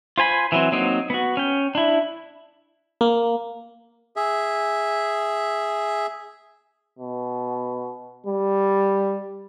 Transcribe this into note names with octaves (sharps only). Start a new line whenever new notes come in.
F4 C5 G#5 B5
E3 F#3 C4
F#3 A#3 C4 D#4
B3 F#4
C#4 G5
D4 E4
A#3
G#4 E5
B2
G3